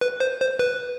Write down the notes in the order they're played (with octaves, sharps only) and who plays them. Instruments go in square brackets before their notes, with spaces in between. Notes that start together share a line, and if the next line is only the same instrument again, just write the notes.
[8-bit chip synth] B4
C5
C5
B4